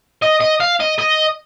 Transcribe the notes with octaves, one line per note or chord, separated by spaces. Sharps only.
D#5
D#5
F5
D#5
D#5